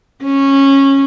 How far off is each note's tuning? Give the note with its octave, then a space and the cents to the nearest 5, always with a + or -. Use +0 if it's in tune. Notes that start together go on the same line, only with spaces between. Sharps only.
C#4 -15